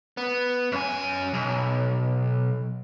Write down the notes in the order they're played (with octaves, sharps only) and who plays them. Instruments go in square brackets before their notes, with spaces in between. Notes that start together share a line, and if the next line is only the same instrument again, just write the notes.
[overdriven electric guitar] B3
F#2 G#5
B1